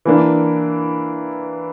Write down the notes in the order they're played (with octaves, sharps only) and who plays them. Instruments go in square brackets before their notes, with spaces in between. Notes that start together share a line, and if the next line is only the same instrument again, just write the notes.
[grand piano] E3 A#3 D4